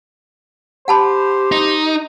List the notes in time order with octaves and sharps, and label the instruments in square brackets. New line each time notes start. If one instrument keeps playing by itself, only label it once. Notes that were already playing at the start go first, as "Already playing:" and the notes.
[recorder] G4 [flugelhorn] C5 [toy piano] F#5 A5 B5
[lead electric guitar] D#4